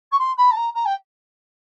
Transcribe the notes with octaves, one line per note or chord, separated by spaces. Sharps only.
C#6
C6
B5
A5
A#5
A#5
G5